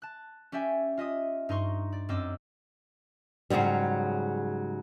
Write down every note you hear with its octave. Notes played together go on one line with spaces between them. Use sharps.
A5 F#6
C#4 G4 D5 E5 G5 G#5
F4 D#5 E5 D#6
G2 D#4 A#5 C6 C#6
D5
F#2 C4 D#5 D6 E6
G#2 C#3 E3 F#3 G3